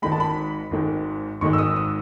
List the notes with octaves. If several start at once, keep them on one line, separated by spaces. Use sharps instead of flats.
G#1 G#2 D#3 G#3 B5
A5
B5
G#1 G#2 D#3 G#3
G#1 G#2 D#3 G#3 C#6
E6
D#6
D#6